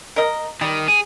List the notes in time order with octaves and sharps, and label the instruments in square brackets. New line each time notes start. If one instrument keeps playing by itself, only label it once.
[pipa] A#4 D#5
[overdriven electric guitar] D#3 [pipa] G3
[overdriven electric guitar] G#4